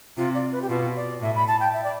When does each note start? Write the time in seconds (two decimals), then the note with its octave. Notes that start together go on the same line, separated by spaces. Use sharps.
0.17 C3 F4
0.35 D5
0.52 B4
0.62 G4
0.69 B2 F4
0.96 D5
1.21 A2 E5
1.35 B5
1.47 A5
1.60 G5
1.74 E5
1.84 D5